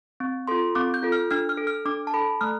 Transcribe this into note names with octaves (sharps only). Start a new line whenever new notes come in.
C4
F4 A4 C6
C4 D6
G6
F4 A4
F6
D4 F6
F6
A4
F6
D4 D6
A5
A4 B5
A3 F6